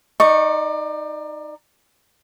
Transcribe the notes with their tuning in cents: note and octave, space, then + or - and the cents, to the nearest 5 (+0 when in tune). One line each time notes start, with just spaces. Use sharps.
D#4 +0 D5 +30 C#6 -10